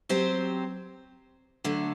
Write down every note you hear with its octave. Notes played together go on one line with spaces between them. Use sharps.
F#3 C4 G4 C5
D3 F#3 A3